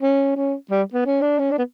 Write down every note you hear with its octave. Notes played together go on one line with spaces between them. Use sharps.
C#4
C#4
G3
B3
C#4
D4
C#4
D4
B3